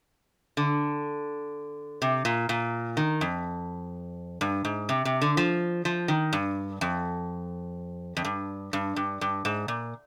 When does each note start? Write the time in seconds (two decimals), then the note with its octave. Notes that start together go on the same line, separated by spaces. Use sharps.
0.57 D3
2.02 C3
2.25 A#2
2.49 A#2
2.97 D#3
3.21 F2
4.41 G2
4.65 G#2
4.89 C3
5.05 C3
5.22 D3
5.37 F3
5.85 F3
6.08 D#3
6.33 G2
6.81 F2
8.17 F2
8.25 G2
8.73 G2
8.96 G2
9.21 G2
9.45 G#2
9.68 A#2